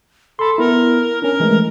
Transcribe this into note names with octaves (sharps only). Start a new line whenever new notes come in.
A4 B5 C6
B3 E4 A#4
C#4 D4 A#4
E3 G#3 A3